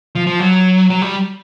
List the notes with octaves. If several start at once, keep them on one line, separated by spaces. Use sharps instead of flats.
F3
F3
F#3
F#3
G3